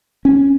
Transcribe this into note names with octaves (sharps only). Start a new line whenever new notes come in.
C#4